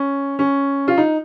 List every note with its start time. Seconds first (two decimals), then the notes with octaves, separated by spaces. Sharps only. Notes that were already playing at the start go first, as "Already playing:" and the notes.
Already playing: C#4
0.39 C#4
0.88 F4
0.98 D#4